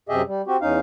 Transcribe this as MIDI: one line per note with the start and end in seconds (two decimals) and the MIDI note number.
0.09 0.22 42
0.09 0.22 48
0.09 0.22 67
0.09 0.22 68
0.09 0.22 75
0.09 0.22 76
0.27 0.42 55
0.47 0.57 60
0.47 0.57 66
0.47 0.57 67
0.62 0.80 40
0.62 0.80 61
0.62 0.80 63
0.62 0.80 77